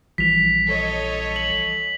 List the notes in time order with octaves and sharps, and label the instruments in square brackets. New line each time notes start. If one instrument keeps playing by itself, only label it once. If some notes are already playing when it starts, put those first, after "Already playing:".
[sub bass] A#1 [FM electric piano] E3 F3 G3 [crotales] B6 F7
[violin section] A4 C#5 D#5
[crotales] F#7